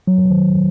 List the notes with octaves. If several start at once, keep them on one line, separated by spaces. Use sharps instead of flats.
F#3
D#3